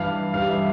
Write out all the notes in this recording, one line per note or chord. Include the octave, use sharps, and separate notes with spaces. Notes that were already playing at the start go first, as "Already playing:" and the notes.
Already playing: G2 E3 G3 F5
G2 E3 G3 F5
E5